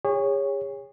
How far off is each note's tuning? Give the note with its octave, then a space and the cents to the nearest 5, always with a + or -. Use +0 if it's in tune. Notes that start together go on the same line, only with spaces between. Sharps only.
G#4 -40 C#5 +0